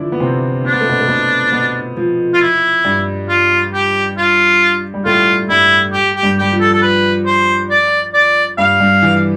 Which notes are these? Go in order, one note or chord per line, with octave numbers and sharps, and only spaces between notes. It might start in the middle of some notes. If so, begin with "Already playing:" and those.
Already playing: D3 E3 F3 D4 E4
B3
C3 C4
C4 D4
B3
A3
B2 B3
A3
B2 B3
B2 B3
F3
F4
E4
G2 G3
F4
G4
F4
G3
A2 A3 F4
G2 G3 E4
G4
G4
G2 G3
G3 G4
F3
A4
A4
B4
C5
D5
D5
G2 G3 F5
G2 G3
E3